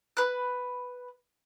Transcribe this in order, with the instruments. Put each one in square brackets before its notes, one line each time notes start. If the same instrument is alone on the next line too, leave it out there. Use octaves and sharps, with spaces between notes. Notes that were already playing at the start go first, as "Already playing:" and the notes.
[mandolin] B4 F#6